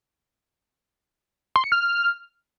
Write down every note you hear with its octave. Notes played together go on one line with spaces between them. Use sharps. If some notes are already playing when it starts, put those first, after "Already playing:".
C6
C#7
F6